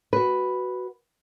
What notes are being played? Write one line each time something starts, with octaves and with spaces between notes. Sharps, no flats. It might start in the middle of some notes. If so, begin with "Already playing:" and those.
F#4 B4